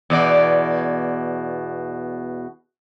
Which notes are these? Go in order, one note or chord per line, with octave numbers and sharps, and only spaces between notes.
E2 B2 D5